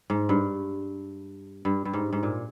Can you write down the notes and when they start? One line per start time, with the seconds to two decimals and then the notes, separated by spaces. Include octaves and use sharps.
0.10 G#2
0.29 G2
1.65 G2
1.85 G2
1.93 G#2
2.13 G#2
2.23 A#2